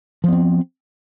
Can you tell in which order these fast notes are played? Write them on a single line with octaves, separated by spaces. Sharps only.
F3 B3 C4